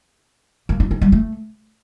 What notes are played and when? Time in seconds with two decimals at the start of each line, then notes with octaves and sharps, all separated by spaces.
0.69 A#3
0.80 D#4
0.91 D#4
1.01 G3
1.12 A3